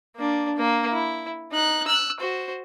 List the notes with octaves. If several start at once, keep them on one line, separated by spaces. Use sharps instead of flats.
A#3 D4
A#3
E4
D#4 F#6
E6 F#6
F#4 C5